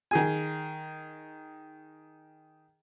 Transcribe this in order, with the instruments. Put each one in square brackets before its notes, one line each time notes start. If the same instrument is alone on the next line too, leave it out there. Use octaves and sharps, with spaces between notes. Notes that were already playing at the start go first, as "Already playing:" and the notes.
[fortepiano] D#3 G#4 G#5